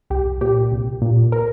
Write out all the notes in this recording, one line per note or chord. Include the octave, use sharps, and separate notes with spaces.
C2 G4
A#2 G4
C2
A#2
A#4